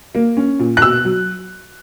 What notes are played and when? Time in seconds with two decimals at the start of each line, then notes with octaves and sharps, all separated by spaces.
0.15 A#3
0.37 C#4
0.59 A#2
0.77 F#6
0.82 B2 E6
1.05 F#3